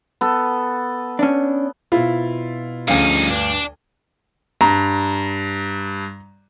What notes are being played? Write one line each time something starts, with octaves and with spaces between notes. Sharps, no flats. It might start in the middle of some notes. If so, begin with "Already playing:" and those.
B3 A4
C#4 D4
B2 C4 E4 F4
D2 G2 F3 C#4 D#4 G#4 F5
G2 D4
G2 A#5